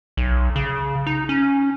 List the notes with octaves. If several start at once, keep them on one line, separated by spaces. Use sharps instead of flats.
B1
C#3
D#4
C#4